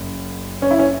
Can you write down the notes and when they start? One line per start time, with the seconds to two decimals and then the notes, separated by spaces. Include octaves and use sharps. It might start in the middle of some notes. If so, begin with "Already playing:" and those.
Already playing: F#1 F#2
0.62 C#4
0.71 E4
0.79 C#4